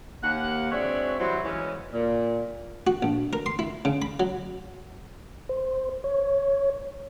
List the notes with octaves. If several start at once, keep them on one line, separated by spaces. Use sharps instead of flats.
D#2 A#3 F#5
G#3 C4 D4 F#4 C#5 E5
E3 F#3 G3 E4 C5
C#3 E3 F#3 G#3 C#4
A#2
F#4
A#1
A#4
C6
E4
C#3
B5
F#3
C5
C#5